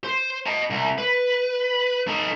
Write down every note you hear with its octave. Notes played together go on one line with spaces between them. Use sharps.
C5
D#5 A5
C2
B4
D#4 A4